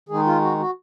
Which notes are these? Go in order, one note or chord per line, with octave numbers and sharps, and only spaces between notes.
D#3 G#3 D#4 G#4
F4
F#4
F#4